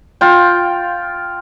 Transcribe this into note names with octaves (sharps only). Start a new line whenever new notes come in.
F4 G5